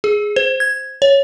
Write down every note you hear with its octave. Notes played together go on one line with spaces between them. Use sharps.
G#4
C5
G#6
C#5